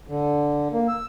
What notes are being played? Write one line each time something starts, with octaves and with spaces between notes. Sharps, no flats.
D3
A#3
E6